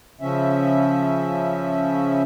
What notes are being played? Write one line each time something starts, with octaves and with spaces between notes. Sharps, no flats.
C#3 F3 C#4 E5